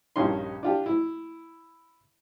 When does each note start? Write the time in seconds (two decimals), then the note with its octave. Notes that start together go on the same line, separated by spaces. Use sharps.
0.16 A#1 G2 C#4 D#4 G4 C6
0.63 D4 F4 G4
0.86 E4